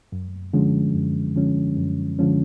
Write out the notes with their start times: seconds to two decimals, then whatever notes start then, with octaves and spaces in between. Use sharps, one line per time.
0.12 F#2
0.53 D3 F3 G#3 C#4
0.95 F#2
1.36 D3 F3 G#3 C#4
1.77 F#2
2.19 D3 F3 G#3 C#4